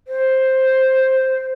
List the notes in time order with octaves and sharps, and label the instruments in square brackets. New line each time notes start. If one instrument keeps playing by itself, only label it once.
[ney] C5